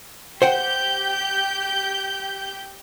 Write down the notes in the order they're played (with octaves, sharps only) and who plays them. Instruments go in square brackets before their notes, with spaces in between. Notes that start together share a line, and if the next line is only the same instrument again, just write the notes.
[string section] G4 G6 [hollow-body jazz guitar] C5 F#5 G5